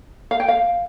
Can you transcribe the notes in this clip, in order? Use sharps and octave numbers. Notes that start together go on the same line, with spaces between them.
F5
G5
F5